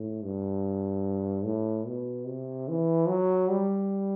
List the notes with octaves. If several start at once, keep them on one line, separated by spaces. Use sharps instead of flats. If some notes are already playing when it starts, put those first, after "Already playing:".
Already playing: A2
G2
A2
B2
C3
E3
F#3
G3